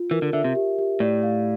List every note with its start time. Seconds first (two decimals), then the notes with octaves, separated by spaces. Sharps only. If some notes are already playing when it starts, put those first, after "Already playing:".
Already playing: F4
0.11 E3 A#4
0.22 D3
0.33 D3 E5
0.44 C3
0.55 G4
0.79 G4
1.00 A2 D5
1.23 F5